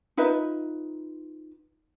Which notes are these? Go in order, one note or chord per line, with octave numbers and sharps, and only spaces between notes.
D#4 F4 B4 E5